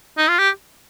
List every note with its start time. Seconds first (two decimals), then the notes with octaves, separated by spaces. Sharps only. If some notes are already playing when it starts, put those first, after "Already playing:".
0.18 D#4
0.28 F4
0.39 G4